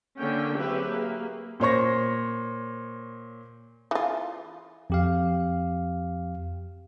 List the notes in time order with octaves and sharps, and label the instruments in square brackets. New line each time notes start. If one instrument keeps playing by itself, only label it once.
[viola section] D3 A#3 C#4 G5
F#3 C4 G4 G#4 B4 E5
A#3 G#4
[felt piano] A#2 C5 C#5 C#6 A#6
[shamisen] E3 F4
[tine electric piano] F2 G4 F5